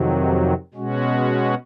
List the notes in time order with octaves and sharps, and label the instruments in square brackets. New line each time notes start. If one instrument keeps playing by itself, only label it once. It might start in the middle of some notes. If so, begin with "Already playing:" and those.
Already playing: [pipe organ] F2 C3 D#3 F#3
B2 G#3 C#4 F#4